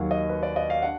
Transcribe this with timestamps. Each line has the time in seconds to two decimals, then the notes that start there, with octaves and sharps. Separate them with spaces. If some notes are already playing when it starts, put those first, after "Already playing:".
Already playing: D#2 D#3 F#3 A#3 F5 F#5
0.11 D#5
0.29 B4
0.43 D5
0.56 D#5
0.70 F5
0.82 D4 F#5